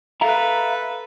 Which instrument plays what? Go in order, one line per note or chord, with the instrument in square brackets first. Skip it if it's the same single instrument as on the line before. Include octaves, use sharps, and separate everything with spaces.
[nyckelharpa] A4 B4 [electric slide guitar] E5 F5 A#5